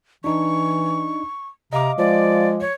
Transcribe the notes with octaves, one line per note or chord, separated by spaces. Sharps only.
E3 D4 D#4 C#6
C3 D#5 F5 A#5 D6
F3 G#3 D5
C#5